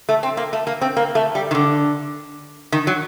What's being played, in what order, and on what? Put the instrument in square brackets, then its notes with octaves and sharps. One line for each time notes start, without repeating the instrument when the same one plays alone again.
[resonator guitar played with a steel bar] A3
C4
A#3
A3
A#3
C4
A#3
A3
G3
D#3
D3
D#3
F#3